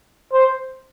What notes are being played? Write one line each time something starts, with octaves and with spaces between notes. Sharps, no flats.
C5